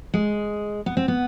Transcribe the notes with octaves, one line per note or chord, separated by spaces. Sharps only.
G#3
B3
C4
B3